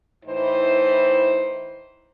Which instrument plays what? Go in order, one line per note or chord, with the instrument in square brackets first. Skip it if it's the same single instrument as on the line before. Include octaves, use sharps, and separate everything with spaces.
[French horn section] A2 E3 D#4 C5